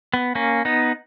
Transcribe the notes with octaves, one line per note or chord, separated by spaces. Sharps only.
B3
A#3 C#4
B3 D#4